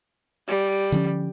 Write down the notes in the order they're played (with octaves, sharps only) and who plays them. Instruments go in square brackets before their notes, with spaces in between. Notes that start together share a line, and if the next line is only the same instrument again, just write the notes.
[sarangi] G3
[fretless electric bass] D3 F3 C#4